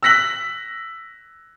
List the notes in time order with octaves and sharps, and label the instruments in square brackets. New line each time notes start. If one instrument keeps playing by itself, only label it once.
[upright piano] E6 F#6 A#6 B6 F#7